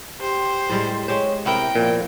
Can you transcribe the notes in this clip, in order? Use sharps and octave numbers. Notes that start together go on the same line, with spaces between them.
G4 C5
A2 G3 G#3
G#3 G4 C5 C#5
C3 B3 E4 A#4 G5
A#2 F3